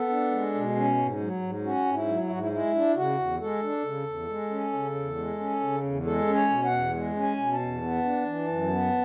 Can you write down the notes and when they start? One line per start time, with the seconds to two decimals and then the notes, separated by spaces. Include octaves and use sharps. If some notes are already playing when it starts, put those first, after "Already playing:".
Already playing: B3 A4
0.10 D4
0.31 G#3
0.54 B2
0.76 C#4
0.98 G#2
1.20 F#3
1.42 G#2
1.64 C#4 F#4
1.86 G#2
1.93 E4
2.08 F#3
2.23 E4
2.30 G#2 F#4
2.39 E4
2.52 G#3 E4
2.74 D4
2.96 C#3 F#4
3.18 E2
3.41 G#3 A4
3.63 D4
3.84 C#3
4.06 E2
4.28 G#3
4.50 C#4
4.73 C#3
4.95 E2
5.17 G#3
5.39 C#4
5.61 C#3
5.83 E2
6.05 G#3 A4
6.27 C#4
6.35 C#5
6.50 B2
6.65 F#5
6.71 E2
6.93 G#3
7.16 C#4
7.23 G#5
7.38 B2
7.52 A5
7.60 E2
7.82 B3
8.04 D4
8.26 E3
8.48 F#2
8.70 B3